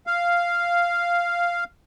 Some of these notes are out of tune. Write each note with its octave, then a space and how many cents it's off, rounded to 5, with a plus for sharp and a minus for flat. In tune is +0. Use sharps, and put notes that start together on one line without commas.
F5 -5